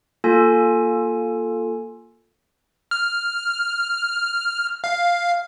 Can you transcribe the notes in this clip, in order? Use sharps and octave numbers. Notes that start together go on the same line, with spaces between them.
A#3 F4 A4 G#5
F6
F5